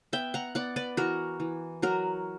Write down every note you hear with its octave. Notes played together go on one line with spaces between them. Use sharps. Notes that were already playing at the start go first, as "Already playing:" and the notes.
B3 E5 G5
F#5 A#5
B3 D5 F#5
B4 D5
E3 F#4 A#4
E3
F#3 F#4 A#4